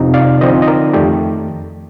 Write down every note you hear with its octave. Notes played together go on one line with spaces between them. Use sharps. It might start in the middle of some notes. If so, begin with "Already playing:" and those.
Already playing: F2 C3 F3 C4 D#4
D5 F5
D3 F3 C4 D#4 C5 D#5
D#5
A#4 D5
F2 D#3 A3 G4